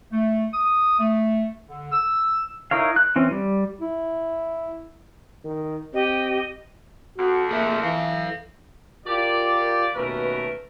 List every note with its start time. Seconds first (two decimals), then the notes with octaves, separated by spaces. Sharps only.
0.12 A3
0.54 D#6
0.99 A3
1.69 D3
1.91 E6
2.71 D#4 E4 A#4 C#5 F5
2.96 F#6
3.16 E3 C4 C#4
3.31 G3
3.81 E4
5.45 D#3
5.94 C4 G4 D#5
7.18 F2 F#4
7.51 A#3 G#4 A#4 E5
7.83 E3 A4 F5
9.07 F4 G4 A#4 D5
9.96 D#2 B2 A3 C#4 A#4 B4